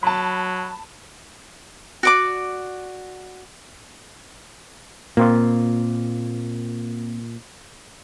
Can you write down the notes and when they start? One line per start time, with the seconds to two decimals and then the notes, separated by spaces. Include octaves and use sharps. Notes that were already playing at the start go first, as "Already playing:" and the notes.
0.03 F#3 A5 B5
2.03 F#4 D5 D6
5.17 A#2 A#3 C4 F4